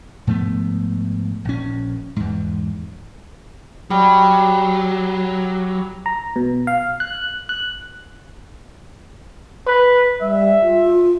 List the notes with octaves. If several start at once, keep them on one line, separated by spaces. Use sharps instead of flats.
G#2 F3 A3 B3
A#1 C#4
E2 G#2
F#3 G3
A#5
B2
F5
F#6
F#6
B4
G3 E5
F4